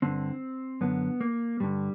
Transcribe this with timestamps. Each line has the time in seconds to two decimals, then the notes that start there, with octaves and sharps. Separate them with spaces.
0.02 G2 D3 C4
0.81 F#2 D3 B3
1.21 A#3
1.60 G2 D3 G3